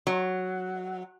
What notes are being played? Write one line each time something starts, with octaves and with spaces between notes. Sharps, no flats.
F#3